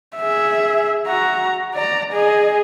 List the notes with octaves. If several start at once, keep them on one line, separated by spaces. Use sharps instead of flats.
G#4 E5
F#4 A#5
D5 A#5
G#4 D#5